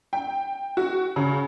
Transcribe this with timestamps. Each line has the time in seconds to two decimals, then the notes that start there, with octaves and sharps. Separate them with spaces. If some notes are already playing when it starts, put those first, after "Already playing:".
0.13 G5
0.77 F#4
1.16 C#3